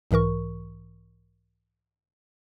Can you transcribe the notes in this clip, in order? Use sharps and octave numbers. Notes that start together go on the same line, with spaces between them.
B1 G#2 E3 A#4 C#6